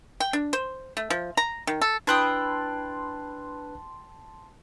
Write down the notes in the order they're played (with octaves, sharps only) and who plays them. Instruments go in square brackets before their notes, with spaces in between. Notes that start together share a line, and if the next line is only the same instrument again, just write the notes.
[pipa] G5
D4
C5
A3
F3
A#5
D#3
A4
[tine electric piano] D4 B4 F#6 [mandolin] E4 G5 D#6 [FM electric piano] A5 C6